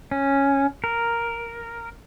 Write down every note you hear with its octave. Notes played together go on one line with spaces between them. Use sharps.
C#4
A#4